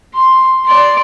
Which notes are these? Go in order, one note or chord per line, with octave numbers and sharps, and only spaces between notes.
C6
D5 C6